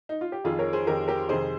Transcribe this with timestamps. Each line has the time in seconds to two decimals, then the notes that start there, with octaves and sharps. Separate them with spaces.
0.09 D#4
0.21 F4
0.32 G4
0.44 F2 D#3 F4 G#4
0.59 A#4 C#5
0.73 G#4 C5
0.87 F2 D#3 G4 A#4
1.08 G4 A#4
1.29 F2 C3 D#3 G#4 C5